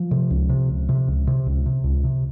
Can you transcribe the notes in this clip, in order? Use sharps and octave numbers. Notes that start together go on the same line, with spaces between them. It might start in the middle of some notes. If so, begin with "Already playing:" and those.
Already playing: F3
C3
C#2
C3
C#2
C3
C#2
C3
C#2
C3
C#2
C3